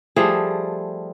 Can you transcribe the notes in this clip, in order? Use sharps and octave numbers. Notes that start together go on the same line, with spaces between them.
F3 G3 A3 G#4